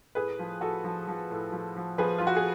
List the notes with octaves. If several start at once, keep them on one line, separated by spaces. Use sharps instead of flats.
A2 G#4 B4
F3
A2 F#4 A4
F3
F3
A2
F3
F3
F3 G#4 B4
F3 F4
F#4
G#4